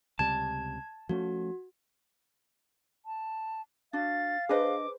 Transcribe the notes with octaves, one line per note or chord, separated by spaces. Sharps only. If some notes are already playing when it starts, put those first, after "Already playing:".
C#2 C3 G3 A5 G#6
F3 A3 C#4 F#4
A5
D4 F#4 F5 A6
D4 G#4 B4 C5 D#5 D6